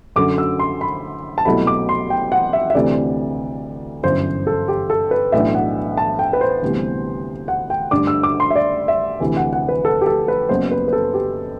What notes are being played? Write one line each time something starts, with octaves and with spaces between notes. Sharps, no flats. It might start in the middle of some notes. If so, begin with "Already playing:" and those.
F#2 D3 F#3 D6
E6
C6
B5
A5
C2 B2 F#3 A3 E4 B5
D6
C6
G5
F#5
E5
E5
D2 C3 E3 A3 C4 D5
G1 F#2 E3 C5
A4
G4
A4
B4
B1 A2 E3 B3 D4 E5
F#5
A5
G5
B4
C5
D2 C3 E3 G3 B3
F#5
G5
G2 D3 A3 D4 D6
E6
D6
C6
E5
D5
E5
D2 C3 E3
F#5
F#5
B4
A4
G4
A4
B4
F#1 F#2 F#3 B3 C5
B4
B4
A4
G4